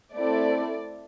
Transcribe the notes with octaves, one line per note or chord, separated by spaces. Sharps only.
A3 C4 E4 A4 D5